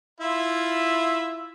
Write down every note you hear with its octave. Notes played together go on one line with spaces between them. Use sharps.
E4 F4 E5